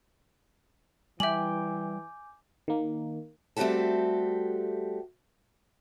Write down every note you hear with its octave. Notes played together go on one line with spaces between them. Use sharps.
E3 G3 E5 G5 G#5 D6 G6 F#7
D#3 A#3
G3 A3 C4 F#4 G4 A4